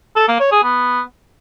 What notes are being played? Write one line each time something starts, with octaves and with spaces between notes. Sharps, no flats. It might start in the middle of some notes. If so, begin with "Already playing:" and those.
A4
A#3
C#5
G#4
B3